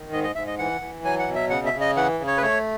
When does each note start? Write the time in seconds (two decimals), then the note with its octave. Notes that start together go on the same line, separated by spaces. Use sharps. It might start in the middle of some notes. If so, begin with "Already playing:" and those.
Already playing: D#3
0.12 G#2 D#5
0.24 D#5
0.35 G#2 E5
0.47 D#5
0.59 E3 F#5
0.81 E3
1.05 F#3 G#5
1.19 F#5
1.28 B2
1.35 E5
1.50 C#3 F#5
1.66 E5
1.73 C#3
1.81 D#5
1.96 E3 F#5
2.20 C#3
2.27 C#5
2.38 B4
2.42 A3 C#5